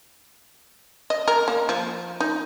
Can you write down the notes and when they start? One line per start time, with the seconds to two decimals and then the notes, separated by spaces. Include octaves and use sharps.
1.10 D#5
1.28 A#4
1.48 A#3
1.69 F3
2.20 D#4